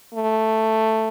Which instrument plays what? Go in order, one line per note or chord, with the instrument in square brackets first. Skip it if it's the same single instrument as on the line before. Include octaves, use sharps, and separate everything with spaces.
[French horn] A3